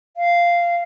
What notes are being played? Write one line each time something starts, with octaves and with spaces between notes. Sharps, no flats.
F5